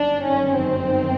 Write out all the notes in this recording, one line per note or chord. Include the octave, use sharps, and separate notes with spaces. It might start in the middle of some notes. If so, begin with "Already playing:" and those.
Already playing: G1 F#2 D#3 D4
C#4
C4